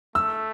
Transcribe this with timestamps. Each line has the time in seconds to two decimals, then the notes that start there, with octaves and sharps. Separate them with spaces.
0.15 A3 E6